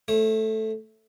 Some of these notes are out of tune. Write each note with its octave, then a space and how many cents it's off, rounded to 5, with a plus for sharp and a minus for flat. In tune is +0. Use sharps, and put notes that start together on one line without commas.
A3 +0 C#5 -40